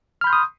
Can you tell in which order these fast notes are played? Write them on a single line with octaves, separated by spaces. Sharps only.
F6 B5 G6 C6 D#6